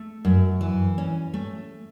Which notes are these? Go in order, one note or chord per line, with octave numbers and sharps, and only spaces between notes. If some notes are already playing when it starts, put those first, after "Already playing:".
Already playing: A3
F#2
E3
C#4
A3